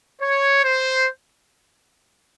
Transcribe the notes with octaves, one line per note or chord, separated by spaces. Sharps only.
C#5
C5